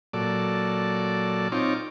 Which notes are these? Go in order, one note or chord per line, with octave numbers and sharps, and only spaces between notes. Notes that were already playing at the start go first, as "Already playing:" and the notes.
A#2 F#3 A4 D5
C4 D#4 F4 C#5 D6